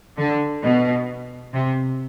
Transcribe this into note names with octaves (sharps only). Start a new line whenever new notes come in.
D3
B2
C3